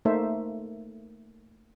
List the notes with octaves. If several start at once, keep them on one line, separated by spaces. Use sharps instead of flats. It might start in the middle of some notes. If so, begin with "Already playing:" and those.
A3 A#3 D#4 A4 C5 E5